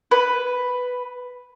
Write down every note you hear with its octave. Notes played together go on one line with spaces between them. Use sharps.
B4